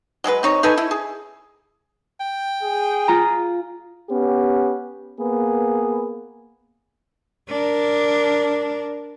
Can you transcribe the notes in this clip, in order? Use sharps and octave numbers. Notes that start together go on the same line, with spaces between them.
F#3 G#3 G#4 B4
C4 D#4 C#5
D#4 A4 B4 G#5
E4
G#4
G5
G#4
F4 A#5
B3 C#4 G4
A#3 B3 G#4 B4
D4 A#4